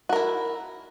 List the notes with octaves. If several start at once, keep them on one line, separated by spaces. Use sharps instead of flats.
E4 F#4 A#4